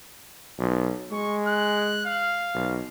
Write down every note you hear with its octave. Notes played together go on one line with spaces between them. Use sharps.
B1
G#3 C#6
F#6
F5
B1